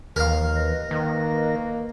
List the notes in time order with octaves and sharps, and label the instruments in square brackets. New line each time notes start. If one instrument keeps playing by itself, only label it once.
[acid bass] D#2 [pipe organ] E3 [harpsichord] A#4 F5
[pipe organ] B4 D#5 A#6
[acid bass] D#3 [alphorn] A#3